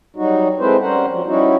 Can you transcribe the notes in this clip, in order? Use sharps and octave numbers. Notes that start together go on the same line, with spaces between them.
F#3 G3 D#4 F#4
G#3 A3 C4 E4 B4 C5
G3 C#4 A#4 C5 F#5
F3 F#3
G3 C#4 D#4 E4 F#4